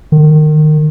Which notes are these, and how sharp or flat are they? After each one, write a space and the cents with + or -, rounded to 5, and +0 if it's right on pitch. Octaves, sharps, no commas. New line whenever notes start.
D#3 -25